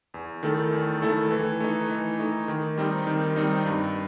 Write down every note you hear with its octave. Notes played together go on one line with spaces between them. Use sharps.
E2
D#3 A3 E4 A4
E2
D#3 A3 E4 A4
E3
A3 D#4
E3
A3 D#4
D#3
G3 C4 D#4
D#3
G3 C4 D#4
G2